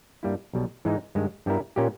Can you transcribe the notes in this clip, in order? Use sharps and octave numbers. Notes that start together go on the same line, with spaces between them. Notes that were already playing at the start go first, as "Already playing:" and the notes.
G2 G3 A#3 E4
B1 B2 G3
G#2 E3 G#3 D#4
G2 D#3 G#3
G2 G3 B3 E4 A#4
A#2 A#3 C#4 G4